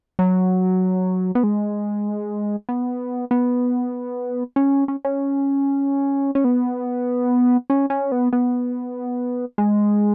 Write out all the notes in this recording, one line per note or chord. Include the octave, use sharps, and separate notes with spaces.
F#3
B3
G#3
B3
B3
C#4
C#4
C#4
C#4
B3
C#4
C#4
B3
B3
G#3